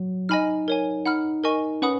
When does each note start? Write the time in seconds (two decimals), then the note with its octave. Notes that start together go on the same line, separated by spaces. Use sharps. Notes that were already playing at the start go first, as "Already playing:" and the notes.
Already playing: F#3
0.29 D#4 D#5 G#5 B5 F6
0.68 A#4 C#5 G#5
1.06 D#4 F#5 B5 F6
1.44 A#4 D#5 G#5 C#6
1.82 C#4 B4 F#5 B5 D#6